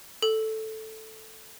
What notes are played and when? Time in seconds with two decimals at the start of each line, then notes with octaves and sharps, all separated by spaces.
0.22 A4